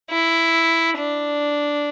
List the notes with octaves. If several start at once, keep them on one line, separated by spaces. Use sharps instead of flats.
E4
D4